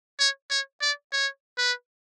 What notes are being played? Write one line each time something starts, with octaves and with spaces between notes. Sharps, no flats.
C#5
C#5
D5
C#5
B4